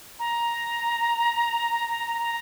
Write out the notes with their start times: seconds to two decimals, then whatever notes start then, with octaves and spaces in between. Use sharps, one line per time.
0.19 A#5
2.22 A#5